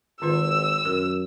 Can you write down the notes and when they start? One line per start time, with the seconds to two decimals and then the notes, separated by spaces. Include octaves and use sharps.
0.22 G#1 D#3 F4 B4 E6
0.85 F#2 A#4